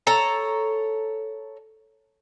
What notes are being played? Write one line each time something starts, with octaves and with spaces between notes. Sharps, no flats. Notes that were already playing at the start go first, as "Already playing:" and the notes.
A4 C#5 A#5